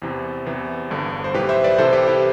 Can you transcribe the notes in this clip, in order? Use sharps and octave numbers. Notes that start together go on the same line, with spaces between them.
E2 C3 E3
E2 C3 E3
G1 G2 D3
C5
B1 A2 E3 G4 B4
C5 E5
B4 D5
C2 C3 E3 A4 C5
G4 B4
E4 G4